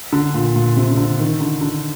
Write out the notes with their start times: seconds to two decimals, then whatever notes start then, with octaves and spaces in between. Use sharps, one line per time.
0.13 D3
0.34 A#2
0.56 A#2
0.76 C3
0.90 C3
0.97 D3
1.19 D#3
1.40 D3
1.61 D3